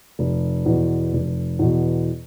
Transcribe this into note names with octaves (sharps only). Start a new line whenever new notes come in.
F1
E2 B2
F1
E2 B2